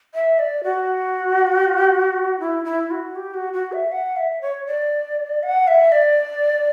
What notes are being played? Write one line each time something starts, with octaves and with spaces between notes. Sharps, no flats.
E5
D5
F#4
E4
E4
F#4
G4
F#4
F#4
E5
F#5
E5
C#5
D5
F#5
E5
D5